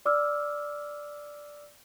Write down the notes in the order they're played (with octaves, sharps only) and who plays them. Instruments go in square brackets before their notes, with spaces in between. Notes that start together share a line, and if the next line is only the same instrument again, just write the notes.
[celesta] D5 D6 E6 F6